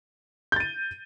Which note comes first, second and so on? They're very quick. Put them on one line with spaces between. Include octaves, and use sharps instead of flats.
G6 A6 D#7